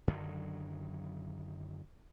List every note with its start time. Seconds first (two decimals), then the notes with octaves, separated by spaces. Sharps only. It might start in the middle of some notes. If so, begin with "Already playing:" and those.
0.08 F#2 D3 D#3 F#3